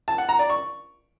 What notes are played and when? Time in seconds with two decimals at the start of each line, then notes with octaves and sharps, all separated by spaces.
0.08 A5
0.18 F#5
0.29 A#5
0.39 D5
0.50 C#6